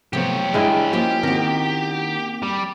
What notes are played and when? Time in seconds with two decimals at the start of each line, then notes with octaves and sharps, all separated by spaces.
0.13 C3 F3 F#3 A3 B3 G4 C#5
0.54 G2 G#3 D4 E4 G5 F6
0.93 F3 A#3 C#4 F#4 G4 D#5
1.23 D#3 A#3 C4 C#4 F#4 A#4
2.43 G3